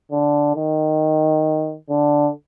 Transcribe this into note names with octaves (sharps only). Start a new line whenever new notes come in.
D3
D#3
D3